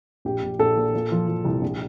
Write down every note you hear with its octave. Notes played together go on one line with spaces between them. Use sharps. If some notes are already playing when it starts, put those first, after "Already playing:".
A#1 G4
A#1
A#1 A4
A#2
A#2
F3
F3
C2
A#1